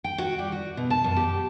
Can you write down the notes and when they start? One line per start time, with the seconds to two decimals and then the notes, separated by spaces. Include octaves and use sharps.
0.04 G5
0.18 F#4
0.39 G3
0.52 F#4
0.77 B2
0.90 A5
1.04 F#2
1.16 G4